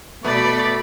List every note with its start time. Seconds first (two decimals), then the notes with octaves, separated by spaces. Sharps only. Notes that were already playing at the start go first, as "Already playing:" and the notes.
0.24 B2 A3 B3 D5 B5